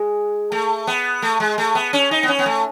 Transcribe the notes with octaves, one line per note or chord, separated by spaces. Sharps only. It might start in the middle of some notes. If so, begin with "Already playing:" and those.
Already playing: G#3
A3
B3
A3
G#3
A3
B3
C#4
D#4
B3
C#4
B3
A3